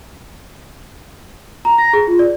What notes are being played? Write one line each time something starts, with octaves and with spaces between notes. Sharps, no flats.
A#5
A#6
G#4
F4
D5